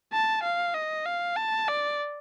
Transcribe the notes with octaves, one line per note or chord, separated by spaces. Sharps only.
A5
F5
D#5
F5
A5
D5